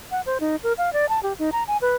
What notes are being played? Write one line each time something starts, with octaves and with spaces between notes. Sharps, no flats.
F#5
C5
D#4
A#4
F5
D5
A5
G4
D#4
A#5
G#5
B4